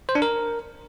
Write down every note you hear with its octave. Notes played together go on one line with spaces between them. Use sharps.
C5
D4
A#4